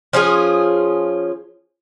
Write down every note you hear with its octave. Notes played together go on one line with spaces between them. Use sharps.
F3 C#4 F4 G#4